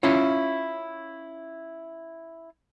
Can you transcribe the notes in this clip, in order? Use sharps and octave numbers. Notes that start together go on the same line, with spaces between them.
C#4 E4 F4 C#5